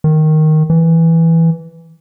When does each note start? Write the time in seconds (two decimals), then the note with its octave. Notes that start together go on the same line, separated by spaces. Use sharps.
0.04 D#3
0.70 E3